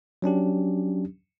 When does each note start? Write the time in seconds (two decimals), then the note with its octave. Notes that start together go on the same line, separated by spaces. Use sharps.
0.22 F#3 C#4 D4 G4